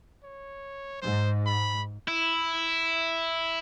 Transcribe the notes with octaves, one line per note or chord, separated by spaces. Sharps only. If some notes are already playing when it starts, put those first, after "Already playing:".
C#5
G#2 C5
B5
E4